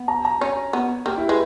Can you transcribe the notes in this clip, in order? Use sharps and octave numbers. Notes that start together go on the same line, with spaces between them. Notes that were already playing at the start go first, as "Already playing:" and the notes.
Already playing: B3
A#5
A#5
C#4 C#5
B3
A#3 G4
E4
G#3 B4